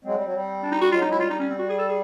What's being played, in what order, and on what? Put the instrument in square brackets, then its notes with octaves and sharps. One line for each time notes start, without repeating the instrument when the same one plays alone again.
[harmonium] F#3 G#3 [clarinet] C4
[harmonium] G3
F#3
G3
[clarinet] D4
D#4
F#4
[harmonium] F#3 G#3 [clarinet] F4
[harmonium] F#3 G#3 [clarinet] D#4
[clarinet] E4
[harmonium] G3 [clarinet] F4
[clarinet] D#4
C#4
C4
F#4
G#4
A4
G#4